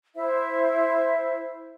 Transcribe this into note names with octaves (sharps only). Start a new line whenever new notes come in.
E4 C5 E5